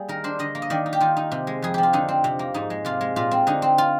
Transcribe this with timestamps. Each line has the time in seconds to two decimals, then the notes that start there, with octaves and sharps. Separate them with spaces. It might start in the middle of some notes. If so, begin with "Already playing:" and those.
Already playing: G3 A#3 G#4
0.08 D#3 A#4
0.24 D4 C5
0.39 D3 D#5
0.55 A#3
0.62 D#5
0.70 D#3 D5
0.86 D#4
0.93 G4
1.00 D#3 F4
1.17 D#4
1.31 C3
1.47 G#3
1.62 F2 G#4
1.74 F3 G4
1.83 F4
1.93 D3 D#4
2.09 C4
2.24 C3
2.39 A#3
2.54 G#2 D#4
2.70 G#3
2.85 C3 F4
3.01 G#3
3.16 A#2 F4
3.31 C4
3.47 D3 D#4
3.62 C4
3.78 F4